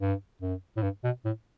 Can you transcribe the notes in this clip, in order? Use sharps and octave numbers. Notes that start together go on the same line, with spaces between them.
G2
F#2
A2
G2
B2
A2